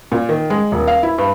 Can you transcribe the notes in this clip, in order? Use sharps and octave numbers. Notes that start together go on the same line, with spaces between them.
A#2
D#3
G#3
D#1
F5
E4
G2